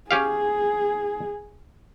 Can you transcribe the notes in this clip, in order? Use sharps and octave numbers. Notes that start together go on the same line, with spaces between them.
C#4 G4 G#4 F5